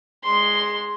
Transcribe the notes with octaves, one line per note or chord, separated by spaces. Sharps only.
G#3 C6